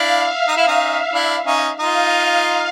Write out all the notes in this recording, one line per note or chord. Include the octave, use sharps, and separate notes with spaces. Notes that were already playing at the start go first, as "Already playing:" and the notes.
Already playing: D4 E4 F5
E5
D#4
E4
C#4 D#4
D4 E4
C#4 D#4
D#4 F4 F5